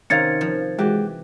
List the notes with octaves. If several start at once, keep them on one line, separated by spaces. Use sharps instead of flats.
C3 D#3 C#4 F5 A#5 G#6 A6 C#7
F3
E3 G#3 F#4 G4